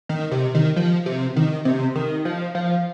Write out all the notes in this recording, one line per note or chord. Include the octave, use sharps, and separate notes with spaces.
D#3
C3
D#3
F3
C3
D#3
C3
D#3
F3
F3